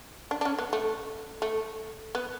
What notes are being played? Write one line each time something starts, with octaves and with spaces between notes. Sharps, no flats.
D4
D4
C#4
B3
A3
A3
B3